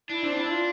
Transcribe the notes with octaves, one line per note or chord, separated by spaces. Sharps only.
D4 E4
C4 D4
D4 E4
F4